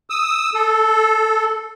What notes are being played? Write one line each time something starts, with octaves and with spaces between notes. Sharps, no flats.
D#6 E6
A4